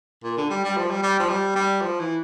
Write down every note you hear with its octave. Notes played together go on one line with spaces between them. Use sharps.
A#2
D3
G3
G3
F3
G3
G3
F3
G3
G3
F3
E3